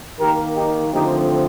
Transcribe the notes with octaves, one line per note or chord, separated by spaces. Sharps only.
D#3 A#3 G4 A#4
D#4 G4
D3 F3 A3 C4 D#4 G4